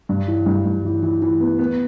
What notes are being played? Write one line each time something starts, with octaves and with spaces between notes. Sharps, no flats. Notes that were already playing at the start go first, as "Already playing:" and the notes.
G2
E3
G2
G2
E3
E3
E3
B3
B3